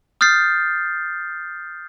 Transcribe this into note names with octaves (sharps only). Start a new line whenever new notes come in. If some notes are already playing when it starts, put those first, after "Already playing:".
D#6 F6 G6 A6 C7